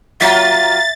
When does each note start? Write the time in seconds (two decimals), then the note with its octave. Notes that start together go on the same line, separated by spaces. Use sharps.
0.21 F#3 A#3 F4 E5 A6